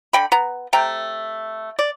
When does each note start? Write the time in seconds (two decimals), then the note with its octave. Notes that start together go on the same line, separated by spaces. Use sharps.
0.13 D3 G5 B5
0.32 B3 A#5
0.73 C3 A3 G5 A#5
1.79 D5